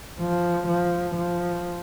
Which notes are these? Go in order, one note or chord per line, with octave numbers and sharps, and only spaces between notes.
F3
F3
F3